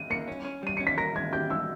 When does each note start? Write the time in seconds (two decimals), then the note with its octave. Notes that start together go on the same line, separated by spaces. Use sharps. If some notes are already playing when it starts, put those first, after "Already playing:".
Already playing: D#7
0.10 A#3 C#7
0.28 C#4
0.45 C#4
0.63 G3 D#7
0.77 C#4 C#7
0.87 B6
0.98 A#4 A#6
1.15 G#3 G#6
1.33 G4 G6
1.50 G#3 E6